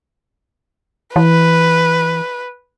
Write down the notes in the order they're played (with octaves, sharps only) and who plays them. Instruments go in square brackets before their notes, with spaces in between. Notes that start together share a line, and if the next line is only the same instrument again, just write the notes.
[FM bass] E3 [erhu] B4